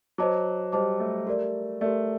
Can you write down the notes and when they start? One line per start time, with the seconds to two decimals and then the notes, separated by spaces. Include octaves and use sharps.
0.18 F#3 C5 D#5 A5 D6
0.72 G3 C5 D#5 A5 D6
1.00 A3
1.27 G4 A#4 D5
1.81 A3 G4 A#4 D5